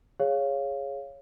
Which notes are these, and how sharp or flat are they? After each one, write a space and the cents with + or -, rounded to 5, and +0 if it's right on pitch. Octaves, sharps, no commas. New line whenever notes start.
G#4 +0 C#5 +0 F5 -5